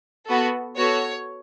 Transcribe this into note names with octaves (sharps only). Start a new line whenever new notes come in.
B3 F#4 A4
B3 F#4 A4 C#5